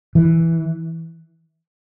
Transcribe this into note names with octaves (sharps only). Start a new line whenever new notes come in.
E3